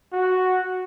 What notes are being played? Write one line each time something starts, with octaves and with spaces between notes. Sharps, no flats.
F#4